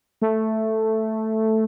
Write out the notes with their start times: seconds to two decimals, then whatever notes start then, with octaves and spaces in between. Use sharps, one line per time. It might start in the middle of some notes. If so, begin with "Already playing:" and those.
0.22 A3